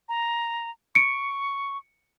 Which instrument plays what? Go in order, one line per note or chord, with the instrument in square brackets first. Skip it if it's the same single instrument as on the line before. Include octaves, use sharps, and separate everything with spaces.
[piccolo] A#5
[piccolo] C#6 [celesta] C#7 D7